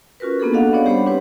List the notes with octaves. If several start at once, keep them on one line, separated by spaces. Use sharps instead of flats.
C#4 F4 F#4 A#4 B4
A#3 B3 D4 G#4 A4
F#4 A4 D#5 F5 F#5
B3 C#4 D4 C#5 D5
G3 G4 C5 C#5 F#5 B5
C4 D4 E4 G4 B4 C5